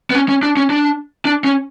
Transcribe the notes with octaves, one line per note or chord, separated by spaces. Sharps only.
B3
C#4
C#4
D4
C#4
D4
D4
C#4